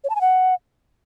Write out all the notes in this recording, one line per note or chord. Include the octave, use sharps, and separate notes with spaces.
C#5
A5
G#5
F#5